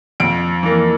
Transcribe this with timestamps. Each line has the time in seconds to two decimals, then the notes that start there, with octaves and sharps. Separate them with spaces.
0.20 F2 D7
0.63 E3 A#3